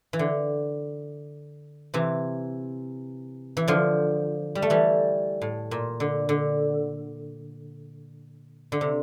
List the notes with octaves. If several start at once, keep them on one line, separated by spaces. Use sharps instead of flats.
E3
D3
C3 E3
E3
D3 F3
G3
A3
E3 G3
A2
A#2
D3
D3
D3
C3